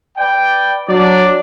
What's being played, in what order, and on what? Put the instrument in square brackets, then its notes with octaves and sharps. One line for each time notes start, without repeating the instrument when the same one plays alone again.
[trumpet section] B4 D5 G5
[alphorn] F#3 [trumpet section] D4 D5